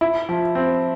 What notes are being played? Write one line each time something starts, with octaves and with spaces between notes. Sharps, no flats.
E4
F3
C4